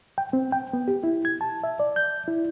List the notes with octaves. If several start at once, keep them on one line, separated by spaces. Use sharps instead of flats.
G5
C4
G5
B3
G4
E4
G#6
A5
E5
D5
G6
E4